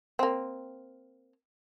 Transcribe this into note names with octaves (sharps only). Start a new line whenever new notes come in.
A#3 C4